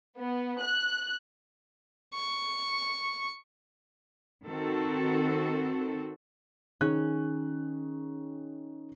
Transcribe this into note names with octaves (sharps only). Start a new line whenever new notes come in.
B3
F#6
C#6
D#3 C4 F#4 A4
D#3 C#4 G#4 F#6